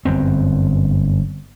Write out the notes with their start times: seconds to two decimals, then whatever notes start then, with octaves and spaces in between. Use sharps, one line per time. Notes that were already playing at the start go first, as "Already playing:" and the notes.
0.05 G1 F#2 C4